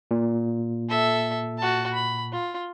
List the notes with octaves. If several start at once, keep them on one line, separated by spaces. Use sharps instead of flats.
A#2
A4 E5
F#4 A5
B5
F4